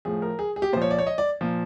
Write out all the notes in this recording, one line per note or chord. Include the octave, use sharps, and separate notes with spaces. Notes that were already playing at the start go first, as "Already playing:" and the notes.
A2 F3 G#4
A#4
G#4
G#4
G4
A#2 F3 C5
C#5
D5
C#5
D#5
D5
A#2 F3